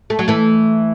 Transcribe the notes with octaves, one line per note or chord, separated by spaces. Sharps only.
A3
F#3
E3 A3